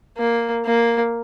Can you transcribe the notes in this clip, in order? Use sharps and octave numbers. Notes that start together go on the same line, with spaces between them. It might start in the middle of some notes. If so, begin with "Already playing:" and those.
A#3
A#3